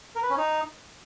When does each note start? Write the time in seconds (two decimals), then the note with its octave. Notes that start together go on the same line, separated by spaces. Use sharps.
0.15 A#4
0.23 B4
0.30 C#4
0.37 D#4